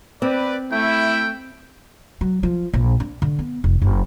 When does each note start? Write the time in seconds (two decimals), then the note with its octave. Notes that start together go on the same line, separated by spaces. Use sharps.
0.22 C4 B4 D5
0.72 A3 E4 G5
2.21 F#3
2.43 F3
2.74 A#1
3.00 D4
3.22 D3
3.39 B3
3.64 F1
3.82 F#1